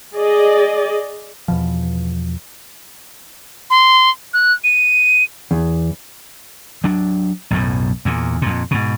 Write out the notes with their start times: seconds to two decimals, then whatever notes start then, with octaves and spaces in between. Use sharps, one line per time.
0.15 G#4 D5 D#5
1.48 E2 B2 F3
3.70 C6
4.34 F#6
4.64 D#7
5.51 E2
6.84 F#3 D4
7.51 B1 F#2 A2
8.05 E2 A#2
8.42 F2 A#2
8.71 G#2 B2